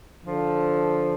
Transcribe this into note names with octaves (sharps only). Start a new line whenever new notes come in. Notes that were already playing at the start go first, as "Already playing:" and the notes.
D3 F3